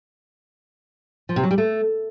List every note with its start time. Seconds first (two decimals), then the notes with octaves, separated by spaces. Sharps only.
1.29 F3
1.36 C3
1.43 F#3
1.51 G3
1.58 A3